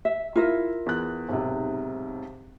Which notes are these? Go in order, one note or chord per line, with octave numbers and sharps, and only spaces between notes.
E5
E4 F4 A#4 E5
E2 F#6
B1 G#2 C3